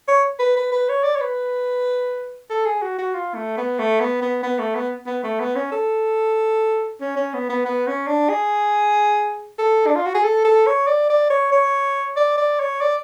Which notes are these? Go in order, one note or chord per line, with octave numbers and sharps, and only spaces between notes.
C#5
B4
B4
B4
C#5
D5
C#5
B4
A4
G#4
F#4
F#4
F4
A3
B3
A3
B3
B3
B3
A3
B3
B3
A3
B3
C#4
A4
C#4
C#4
B3
B3
B3
C#4
D4
G#4
A4
D4
F4
F#4
G#4
A4
A4
C#5
D5
D5
C#5
C#5
D5
D5
C#5
D5